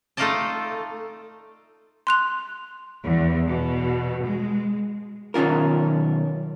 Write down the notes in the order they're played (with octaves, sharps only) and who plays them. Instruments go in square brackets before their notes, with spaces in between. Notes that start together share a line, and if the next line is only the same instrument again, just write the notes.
[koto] A3 D#4 F4 D5 D#5 A5
[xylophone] C6 F#6 F7
[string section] E2
B2
G#3
[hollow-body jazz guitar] B1 D#3 C#4 F4 A#4